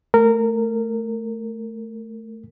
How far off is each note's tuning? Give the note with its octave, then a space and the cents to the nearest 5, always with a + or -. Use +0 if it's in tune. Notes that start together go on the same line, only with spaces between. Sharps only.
A3 +0 A#4 -20